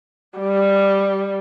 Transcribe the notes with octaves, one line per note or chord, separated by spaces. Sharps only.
G3